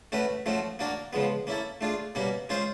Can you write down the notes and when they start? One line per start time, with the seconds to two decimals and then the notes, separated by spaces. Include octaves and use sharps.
0.12 A3 C#4 F#4 B4
0.46 F3 A3 C#4 F#4
0.79 A#3 D4 F#4 A#4
1.13 C#3 F3 G#3 B3
1.47 A#3 C#4 E4 A4
1.81 A3 D4 F4 G#4
2.15 B2 G3 A#3 C#4 F#4
2.49 G#3 C#4 F4 G#4 C5